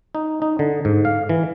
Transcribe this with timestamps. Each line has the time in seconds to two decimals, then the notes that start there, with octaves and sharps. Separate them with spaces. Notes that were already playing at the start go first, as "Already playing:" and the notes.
0.15 D#4
0.42 D#4
0.59 D3
0.85 G#2
1.05 F5
1.29 E3